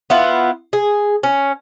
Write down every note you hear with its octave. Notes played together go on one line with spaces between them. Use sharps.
B3 E4 F4
G#4
C#4